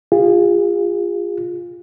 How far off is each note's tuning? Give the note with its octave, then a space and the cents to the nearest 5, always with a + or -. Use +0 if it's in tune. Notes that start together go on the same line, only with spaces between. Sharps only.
F4 +0 G#4 -40